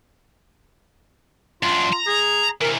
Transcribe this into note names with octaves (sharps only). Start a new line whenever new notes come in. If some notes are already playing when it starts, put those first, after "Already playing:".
F#2 D4 F4
A#5
G#4
C3 E3 A#4